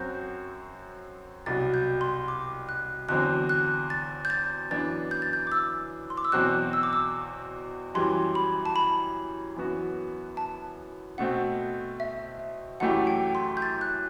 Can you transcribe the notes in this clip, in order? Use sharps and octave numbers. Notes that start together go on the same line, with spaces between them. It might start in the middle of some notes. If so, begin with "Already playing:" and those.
Already playing: F#2 F#3 C4 F#4 G6
C2 B2 F#3 A6
G6
C6
D6
F#6
E2 D3 F#3 C4 F#6
F#6
A6
G6
A6
F#2 E3 B3 D4 A6
G6
A6
G6
D6
E6
C6
D6
E6
E2 B2 F#3 C4 F#4 F#6
E6
D6
E6
F#2 E3 G3 C6
B5
A5
B5
F#2 E3 B3 F#4
A5
B2 A3 C4 F#5
E5
F#2 E3 A3 E4 G4 F#5
G5
C6
G6
A6
F#6